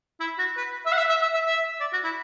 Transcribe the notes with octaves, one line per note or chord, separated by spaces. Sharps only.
E4
F#4
B4
E5
F#5
E5
E5
E5
E5
E5
D5
F#4
E4